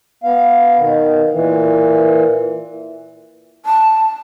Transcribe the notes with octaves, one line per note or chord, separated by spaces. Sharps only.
B3 F5
B2 D#3
A#2 E3
A5